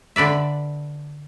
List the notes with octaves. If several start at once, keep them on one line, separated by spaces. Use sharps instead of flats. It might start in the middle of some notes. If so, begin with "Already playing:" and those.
D3 B4 D5 E5